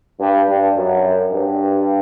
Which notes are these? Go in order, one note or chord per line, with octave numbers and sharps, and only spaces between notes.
G2
G2
F#2
G2